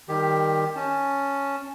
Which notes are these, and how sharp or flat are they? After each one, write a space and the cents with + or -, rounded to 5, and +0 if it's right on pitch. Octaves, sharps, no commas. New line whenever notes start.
D#3 +0 G3 +0 G4 +10
C#4 +0 A5 +0